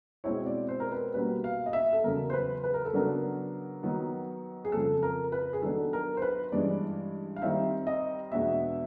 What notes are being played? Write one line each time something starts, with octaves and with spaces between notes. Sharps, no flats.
B2 G#3 C4 E4 C#5
D5
C5
A#4
B4
B2 G3 A#3 C#4 F#4 B4
F5
D#5
E5
A4
E2 C#3 F#3 A#4
C5
B4
B4
A#4
A4
C#3 F#3 B3 D4 A#4
D#3 F#3 B3
G#4
F2 C#3 F3 A4
A#4
B4
G#4
D#3 F#3 B3 D4 A4
A#4
C5
B4
G2 E3 G#3 C#4 D5
F5
D#3 G3 C4 E5
D#5
E2 B2 G#3 B3 D4 E5